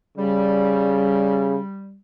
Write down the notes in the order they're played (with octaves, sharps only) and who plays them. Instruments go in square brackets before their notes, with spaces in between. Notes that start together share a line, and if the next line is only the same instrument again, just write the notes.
[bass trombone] C#3 [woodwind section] G3